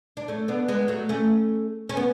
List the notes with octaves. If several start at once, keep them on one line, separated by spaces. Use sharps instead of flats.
D4
A3 C#4
B3 D4
G#3 B3
F#3 A3
A3 C#4
C#4
B3